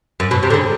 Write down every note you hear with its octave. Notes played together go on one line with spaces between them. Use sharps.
F#2
B2
C3
D3
C#3